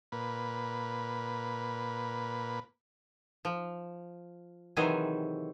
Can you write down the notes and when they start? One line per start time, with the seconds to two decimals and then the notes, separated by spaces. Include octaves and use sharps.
0.12 A#2 B4
3.45 F3
4.77 C3 D#3 E3 F#3 G#4 C5